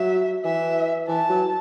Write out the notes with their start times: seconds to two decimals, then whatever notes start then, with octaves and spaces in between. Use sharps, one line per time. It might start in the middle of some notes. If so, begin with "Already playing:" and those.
Already playing: F#3 E5
0.45 E3 E5
1.08 E3 A5
1.29 F#3